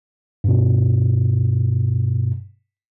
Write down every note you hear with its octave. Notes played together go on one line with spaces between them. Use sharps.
G2 B2